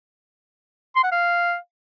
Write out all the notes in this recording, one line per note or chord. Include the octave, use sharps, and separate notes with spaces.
C6
F#5
F5